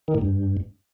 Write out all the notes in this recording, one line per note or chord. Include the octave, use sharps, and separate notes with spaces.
D#3
A2
G2